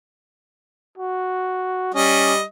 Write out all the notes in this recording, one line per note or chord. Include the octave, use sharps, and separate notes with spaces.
F#4
G3 C#4 D#5